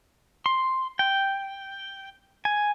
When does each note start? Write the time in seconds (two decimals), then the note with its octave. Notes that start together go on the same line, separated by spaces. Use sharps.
0.46 C6
0.99 G5
2.45 G#5